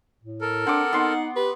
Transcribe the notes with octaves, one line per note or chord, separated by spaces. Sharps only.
A2
A4 A#4
C4 D4 F#5 D6
B3 D#4 C6
G4 B4